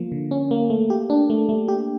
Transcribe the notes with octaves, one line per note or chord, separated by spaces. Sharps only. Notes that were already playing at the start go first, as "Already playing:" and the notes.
Already playing: F3 A#3
D3
C#4
A#3
A3
G4
D4
A3
A3
G4